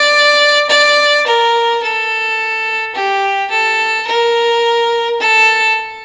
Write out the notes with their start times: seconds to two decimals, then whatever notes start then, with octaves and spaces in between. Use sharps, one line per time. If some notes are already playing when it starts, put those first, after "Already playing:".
Already playing: D5
0.70 D5
1.27 A#4
1.83 A4
2.95 G4
3.51 A4
4.07 A#4
5.20 A4